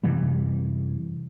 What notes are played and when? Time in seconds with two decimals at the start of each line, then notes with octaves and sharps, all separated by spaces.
0.04 F#2 C3 E3 G3